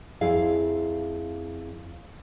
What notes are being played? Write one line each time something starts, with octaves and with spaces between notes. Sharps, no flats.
F2 E4 G#4 F5